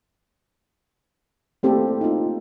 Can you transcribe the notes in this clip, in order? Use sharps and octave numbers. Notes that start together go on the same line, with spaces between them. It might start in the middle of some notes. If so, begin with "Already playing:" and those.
A3 A#3 C4 E4 G4 A4
D#4 F4